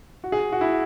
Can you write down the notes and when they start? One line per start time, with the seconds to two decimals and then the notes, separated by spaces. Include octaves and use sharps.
0.24 F#4
0.32 G#4
0.52 F#4
0.61 E4